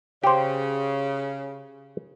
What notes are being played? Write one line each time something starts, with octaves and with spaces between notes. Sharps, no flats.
C#3 G4 C5